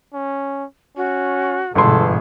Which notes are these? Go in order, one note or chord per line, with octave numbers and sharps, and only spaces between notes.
C#4
C#4 F#4
G1 G#2 B2 E3 G#4 A4 C6